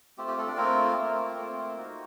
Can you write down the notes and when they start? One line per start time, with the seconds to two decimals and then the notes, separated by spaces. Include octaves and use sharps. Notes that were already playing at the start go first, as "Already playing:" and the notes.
0.18 A3 C4 F4 G4
0.28 G4
0.38 A3 A4
0.47 D4 D5
0.57 A3 A#3 C4 F4 A#4
0.97 A3 C4 F4
1.37 A3 C4 F4
1.76 A#3 D#4 F#4